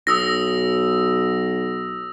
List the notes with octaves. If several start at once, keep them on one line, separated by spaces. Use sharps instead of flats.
B1 D#6 E6 A#6